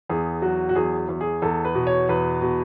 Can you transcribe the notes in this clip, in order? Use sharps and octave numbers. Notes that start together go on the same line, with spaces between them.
E2 G#4
F#3 F#4
F#4
E2 G#4
E2
G#4
E2 A4
B4
B2
C#5
E2 B4
B2